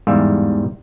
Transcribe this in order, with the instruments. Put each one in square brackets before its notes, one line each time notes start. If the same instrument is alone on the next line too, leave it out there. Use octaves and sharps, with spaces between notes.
[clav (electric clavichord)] G1 E2 G#2 G3 E5 F5